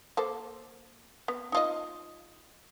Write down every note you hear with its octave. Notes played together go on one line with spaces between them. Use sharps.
A#3 A4 C5
B3
D#4 F4 D#5